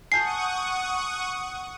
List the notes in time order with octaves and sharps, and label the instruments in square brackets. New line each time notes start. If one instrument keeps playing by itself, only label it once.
[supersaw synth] F#5 C#6 D#6 [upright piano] G#5 A5 G6 [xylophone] C7